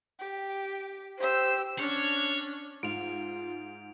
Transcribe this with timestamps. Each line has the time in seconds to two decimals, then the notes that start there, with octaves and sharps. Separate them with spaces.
0.18 G4
1.19 G4 C5 E6
1.79 C#4 D4 C#5
2.83 G#2 F4 D7 F7